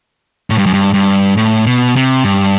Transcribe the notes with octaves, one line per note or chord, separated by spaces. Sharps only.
A2
G2
F#2
G2
G2
A2
B2
C3
G2